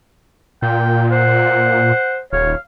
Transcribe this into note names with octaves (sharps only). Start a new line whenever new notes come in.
A#2 G5
C5 F#5
D#1 C#5 F5